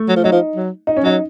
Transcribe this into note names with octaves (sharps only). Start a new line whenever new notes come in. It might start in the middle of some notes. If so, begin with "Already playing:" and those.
Already playing: A3
F#3
F3
F#3 D#4
F3
F#3
D#4
C#4
F#3 D#4